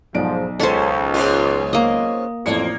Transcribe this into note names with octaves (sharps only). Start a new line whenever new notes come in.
B1 G#2 F3 D5 D7
C#2 C#4 A4 C5
G#2 C#4 F4
A#3 D#5
A1 F2 A#3 D5 C#7